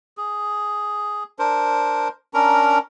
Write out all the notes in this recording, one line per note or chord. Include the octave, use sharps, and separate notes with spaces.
G#4
D4 A#4 C5
C#4 D4 A#4 A#5